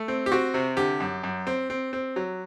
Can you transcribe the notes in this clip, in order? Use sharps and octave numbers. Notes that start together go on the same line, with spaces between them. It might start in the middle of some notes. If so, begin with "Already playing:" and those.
Already playing: A3
C4
G4
C4 F#4
C3
D3 G4
F#2
F#2
C4
C4
C4
F#3